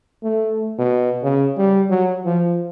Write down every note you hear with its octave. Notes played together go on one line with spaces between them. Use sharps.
A3
B2
C#3
G3
F#3
F3